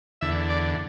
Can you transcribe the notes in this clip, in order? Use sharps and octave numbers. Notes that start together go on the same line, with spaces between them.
E2 D3 E5
D5